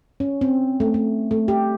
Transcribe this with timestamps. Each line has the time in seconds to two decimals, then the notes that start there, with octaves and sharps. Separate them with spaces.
0.20 C#4
0.41 C4
0.80 A3
0.94 A3
1.31 A3
1.48 G4